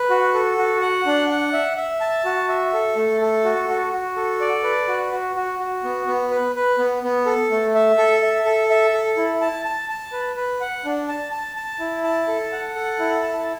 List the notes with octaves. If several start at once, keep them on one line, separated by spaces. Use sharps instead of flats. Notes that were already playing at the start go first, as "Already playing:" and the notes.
Already playing: B4
F#4
A4
F#4
F#5
D4
F#5
E5
E5
A5
F#4
E5
A4
A3
A4
F#4
F#4
F#4
A4
D5
B4
F#4
F#4
F#4
F#4
B3
B3
B4
B4
B3
B3
A4
A3
E5
A4
E5
A4
E5
A4
E4
A5
A5
A5
B4
B4
F#5
D4
A5
A5
A5
E4
A5
A4
F#5
A4
E4
A5